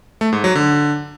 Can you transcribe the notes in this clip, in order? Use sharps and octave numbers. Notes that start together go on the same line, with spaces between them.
A3
G#2
F#3
D3